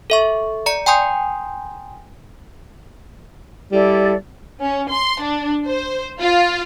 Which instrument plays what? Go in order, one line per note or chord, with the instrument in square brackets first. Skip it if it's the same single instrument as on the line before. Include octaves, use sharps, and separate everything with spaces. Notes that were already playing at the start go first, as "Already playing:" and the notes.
[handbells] A4 E5 C#6
D5 A#5 C#7
G5 G#5 A#5 C6 D#6 G6
[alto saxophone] G3 [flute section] E4 A4 D5
[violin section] C#4
C6
D4
C5
F4